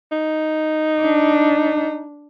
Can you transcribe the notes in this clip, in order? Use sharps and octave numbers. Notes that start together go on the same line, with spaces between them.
D#4
D4